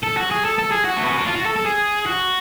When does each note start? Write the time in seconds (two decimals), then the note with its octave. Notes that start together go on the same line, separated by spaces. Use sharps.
0.04 A4
0.17 F#4
0.31 G#4
0.45 A4
0.58 A4
0.71 G#4
0.85 F#4
0.97 A3
1.04 B3
1.11 C#4
1.18 D4
1.26 F4
1.36 F#4
1.45 A4
1.56 A4
1.65 G#4
2.06 F#4